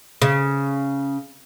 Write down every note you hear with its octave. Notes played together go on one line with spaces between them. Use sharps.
C#3